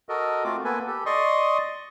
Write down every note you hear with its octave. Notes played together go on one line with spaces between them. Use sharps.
F#4 A4 A#4 D#5
A3 C4 F4 F#4 D6
A#3 B3 A4 B4 G#5
G4 A4
D5 D#5 C6 C#6 D#6